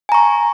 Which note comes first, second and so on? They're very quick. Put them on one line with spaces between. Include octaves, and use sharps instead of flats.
G#5 A#5 C#6